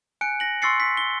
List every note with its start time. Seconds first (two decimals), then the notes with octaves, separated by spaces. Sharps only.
0.21 G#5 F#6 C#7 D7
0.40 A#6 F#7
0.62 C6 C#6 E6 A6 C7 C#7
0.80 B6
0.97 G7